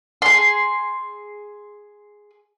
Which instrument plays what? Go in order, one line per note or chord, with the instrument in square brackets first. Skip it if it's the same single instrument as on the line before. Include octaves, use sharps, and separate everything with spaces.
[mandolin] G#4 C6